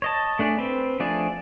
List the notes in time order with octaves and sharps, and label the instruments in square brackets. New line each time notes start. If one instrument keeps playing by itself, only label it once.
[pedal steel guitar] C#5 D#5 A5
A3 D4 G#4 D5
C4 B4
F3 A3 D4 G#4 D5